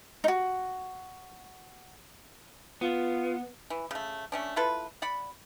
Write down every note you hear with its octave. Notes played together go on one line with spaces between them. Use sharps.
D#4 F#4
B3 F4
E3
C#3 A3
A3 C#4 D4
E4 F4 A4 B4
D5 F#5 B5